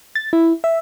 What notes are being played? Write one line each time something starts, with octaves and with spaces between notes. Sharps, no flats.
A6
E4
E5